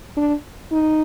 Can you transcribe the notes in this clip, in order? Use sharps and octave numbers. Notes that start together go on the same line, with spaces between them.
D4
D#4